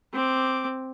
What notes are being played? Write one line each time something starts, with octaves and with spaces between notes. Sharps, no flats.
C4 D6